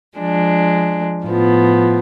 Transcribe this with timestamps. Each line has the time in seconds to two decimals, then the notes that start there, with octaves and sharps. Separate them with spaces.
0.18 F3 G#3 D4
1.24 A2 F3 B3